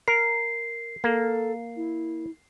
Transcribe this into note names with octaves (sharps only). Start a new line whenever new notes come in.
A#4 C7
A#3 A4
E4